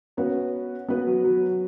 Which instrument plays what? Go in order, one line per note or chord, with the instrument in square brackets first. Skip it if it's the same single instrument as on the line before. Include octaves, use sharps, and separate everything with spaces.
[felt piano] B3 F#4 B4 [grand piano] C#4
[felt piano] B3 F#4 B4
[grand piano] F#3
F#3